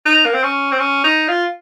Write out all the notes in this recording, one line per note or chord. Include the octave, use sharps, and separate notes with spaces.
D#4
A#3
C4
C#4
C4
C#4
D#4
F4